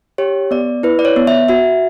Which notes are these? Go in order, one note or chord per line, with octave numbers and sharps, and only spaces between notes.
G4 C#5
B3 D5
E4 B4
D5
C#5
B3
E5
F#4 E5